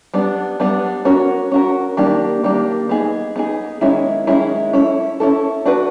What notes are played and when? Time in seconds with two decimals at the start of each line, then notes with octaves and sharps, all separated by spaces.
0.14 G3 B3 D4
0.60 G3 B3 D4
1.05 C#4 F#4 A#4
1.52 C#4 F#4 A#4
1.97 D#3 G3 A#3 D4 G4
2.43 D#3 G3 A#3 D4 G4
2.89 B3 D#4 G#4
3.36 B3 D#4 G#4
3.81 D#3 G#3 C#4 E4
4.27 D#3 G#3 C#4 E4
4.73 C#4 E4 A4
5.20 C#4 E4 A4
5.66 D4 F#4 B4